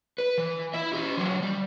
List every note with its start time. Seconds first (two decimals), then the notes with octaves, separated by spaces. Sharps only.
0.18 B4
0.38 E3
0.74 E4 E5
0.93 C#4 G4
1.17 E3 F#3
1.43 G3